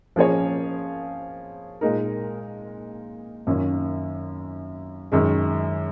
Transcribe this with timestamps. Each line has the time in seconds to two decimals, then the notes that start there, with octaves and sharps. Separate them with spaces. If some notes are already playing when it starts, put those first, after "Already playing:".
0.16 F3 A#3 C#4 G#4 C#5
1.81 A#2 G#3 D#4 A#4
3.47 F#2 D#3 A#3 C#4 F4
5.12 F#2 D#3 G#3